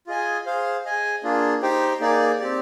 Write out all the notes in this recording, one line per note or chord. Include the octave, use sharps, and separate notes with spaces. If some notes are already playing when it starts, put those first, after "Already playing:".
F4 G#4 D#5 G#5
G#4 C5 F5
G#4 D#5 G#5
A#3 D4 F4 G#4
D#4 G4 C5 G5
A#3 D#4 G#4 D5
C4 G4 D5